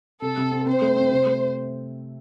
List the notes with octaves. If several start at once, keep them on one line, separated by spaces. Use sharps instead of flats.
C3 A4
C3
C4
C4 C5
A3
C4
C3
A3